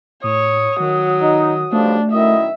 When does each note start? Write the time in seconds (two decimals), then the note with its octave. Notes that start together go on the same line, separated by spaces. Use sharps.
0.24 A2 C#5 D#6
0.80 D#3 F#3
1.21 D#4
1.72 B1 F3 G3 A3 D4
2.12 F#2 D#3 E4 D#5 E5